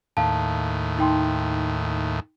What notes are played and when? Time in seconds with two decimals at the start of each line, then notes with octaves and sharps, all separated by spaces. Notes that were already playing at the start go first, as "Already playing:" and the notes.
0.17 D#2 A2 F5 A5
0.98 D#4 G5 C6